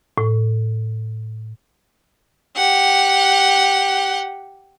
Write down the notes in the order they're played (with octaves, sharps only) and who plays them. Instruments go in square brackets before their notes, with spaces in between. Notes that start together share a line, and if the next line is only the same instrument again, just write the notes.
[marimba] A2
[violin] G4 F#5